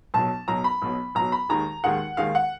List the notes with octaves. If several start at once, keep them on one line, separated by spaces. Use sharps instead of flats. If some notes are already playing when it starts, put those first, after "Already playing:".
B1 B2 F#3 A5
B1 B2 F#3 A#5
B5
B1 B2 F#3
B1 B2 F#3 A#5
B5
D#2 D#3 G#3 A#5
D#2 D#3 G#3 F#5
D#2 D#3 G#3 F5
F#5